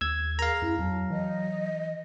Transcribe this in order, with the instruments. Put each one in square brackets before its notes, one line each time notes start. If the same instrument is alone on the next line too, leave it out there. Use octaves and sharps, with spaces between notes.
[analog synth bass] D#2 [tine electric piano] E6 G#6
[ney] G#4 [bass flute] A#4 [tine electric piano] F5 A#5
[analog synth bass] F#2 [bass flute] E4
[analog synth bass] F2 [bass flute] F#3 [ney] A5
[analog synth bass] E3 [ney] D#5